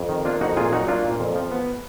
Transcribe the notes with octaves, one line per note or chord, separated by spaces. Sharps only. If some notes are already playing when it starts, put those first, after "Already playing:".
Already playing: F2
D#3
A#3 D4 F4
F2 D#4 F#4
A#2 F4 G#4
F#3 D#4 F#4
A#3 D4 F4
A#2
F2
F3
B3